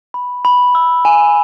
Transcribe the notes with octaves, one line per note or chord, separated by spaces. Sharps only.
B5
B5
E6
G#5